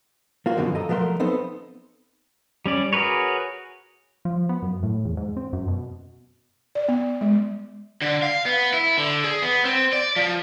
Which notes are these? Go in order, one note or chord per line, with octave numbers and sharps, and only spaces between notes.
A#3 F4 F#4
F#2 B2 D3 D#3 F3
A4 D#5 A#5
F3 F#3 A3 A#4 C6
B3 C4 D#4 A4 C5
G3 C#4 D5
F#4 G#4 A#4 B4 C#5
F3
B3
F#2
A2
E2
G#2
C4
F#2
B2
D5
B3
G#3
D3
F5
B3
E4
D3
G#4
B3
C4
D5
F3